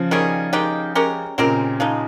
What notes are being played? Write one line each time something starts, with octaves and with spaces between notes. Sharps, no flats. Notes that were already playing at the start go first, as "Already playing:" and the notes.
Already playing: C#3 F3
D#3 G3 C#4 G#4
D#3 G#3 D#4 G4
G#3 C#4 G4 A#4
A#2 C#3 G#3 C4 G4 A#4
F3 G#3 D#4